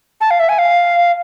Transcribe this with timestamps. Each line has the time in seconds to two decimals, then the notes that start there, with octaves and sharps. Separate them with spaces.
0.21 A5
0.31 F5
0.40 E5
0.49 G#5
0.58 F5